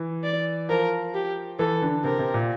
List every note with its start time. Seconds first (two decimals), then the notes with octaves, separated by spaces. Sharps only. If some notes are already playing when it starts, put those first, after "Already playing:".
Already playing: E3
0.24 D5
0.69 F3 A#4
1.14 G4
1.59 E3 A4
1.82 D3
2.04 C3 A#4
2.19 C3
2.34 A#2